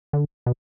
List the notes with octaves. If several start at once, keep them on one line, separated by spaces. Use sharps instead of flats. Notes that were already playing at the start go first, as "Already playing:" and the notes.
D3
B2